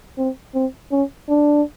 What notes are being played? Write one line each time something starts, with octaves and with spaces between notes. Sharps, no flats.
C4
C4
C#4
D4